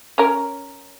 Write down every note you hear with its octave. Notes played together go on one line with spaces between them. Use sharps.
C#4 A#4